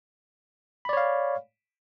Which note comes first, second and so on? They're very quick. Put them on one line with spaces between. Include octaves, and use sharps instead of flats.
B5 D5 C#5 F5